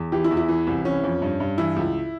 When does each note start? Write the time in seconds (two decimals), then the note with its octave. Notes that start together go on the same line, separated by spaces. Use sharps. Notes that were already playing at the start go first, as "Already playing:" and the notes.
Already playing: E2
0.12 E3 G4
0.24 E4
0.31 E2
0.37 E4
0.49 E3
0.67 C2
0.85 E3 C#4
1.04 F2
1.22 G2
1.40 G2
1.58 E3 E4
1.76 C#2